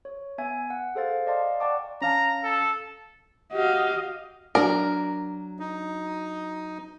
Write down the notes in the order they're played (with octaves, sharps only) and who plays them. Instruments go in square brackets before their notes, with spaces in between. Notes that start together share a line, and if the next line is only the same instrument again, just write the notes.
[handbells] C#5
B3 E5 G#5 G#6
F#5
G#4 A4 C5 F5 A6
D5 D#5 F5 A5 C6
D5 F#5 G5 A5 C#6 D6
[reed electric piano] C#4 F5 A5 [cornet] A#5
[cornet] A4
[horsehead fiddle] F#4 D#5 [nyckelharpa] G4 F5
[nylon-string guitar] F#3 D4 F#4 [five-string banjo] A#4
[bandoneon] D#4